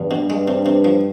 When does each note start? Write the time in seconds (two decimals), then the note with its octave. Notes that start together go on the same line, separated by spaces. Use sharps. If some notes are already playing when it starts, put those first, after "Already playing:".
Already playing: E2 G2
0.11 B2
0.30 G2 G#3
0.48 C3
0.66 C3
0.85 F3